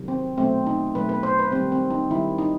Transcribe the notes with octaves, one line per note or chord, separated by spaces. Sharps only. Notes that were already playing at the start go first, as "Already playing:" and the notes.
Already playing: C3 D#3 F#3
C4
B2 F#3 A3 C4
D#4
B2 F#3 A3 B4
B4
C5
B4
D#3 G3 C4
C4
D#4
D#3 G3 E4
D#4